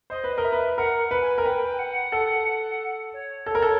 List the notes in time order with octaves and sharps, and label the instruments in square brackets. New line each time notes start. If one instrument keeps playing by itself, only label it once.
[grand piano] C5 [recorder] D#5
[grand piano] B4
[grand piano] A#4 [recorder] D#5
[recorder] E5
[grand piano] B4
[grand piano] A#4 [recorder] F#5
[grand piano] B4
[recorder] G#5
[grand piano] A#4
[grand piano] B4 [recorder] G5
[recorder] F#5
[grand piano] A4
[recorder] C#5
[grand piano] A4
A#4
A4